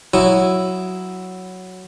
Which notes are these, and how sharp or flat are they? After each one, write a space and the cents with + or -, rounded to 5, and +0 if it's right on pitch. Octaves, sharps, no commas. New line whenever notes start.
F#3 +0 E4 +0 D#6 +0